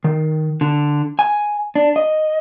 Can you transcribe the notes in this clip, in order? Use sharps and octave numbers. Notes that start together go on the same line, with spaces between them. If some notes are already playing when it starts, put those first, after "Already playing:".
D#3
D3
G#5
D4
D#5